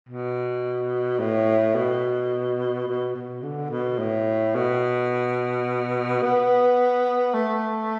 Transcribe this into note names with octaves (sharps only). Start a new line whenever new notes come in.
B2
A2
B2
B2
B2
D3
B2
A2
B2
B3
A3